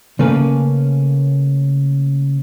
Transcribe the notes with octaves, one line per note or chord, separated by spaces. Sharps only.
C#3 A3 A#3 C#4 A#4 B4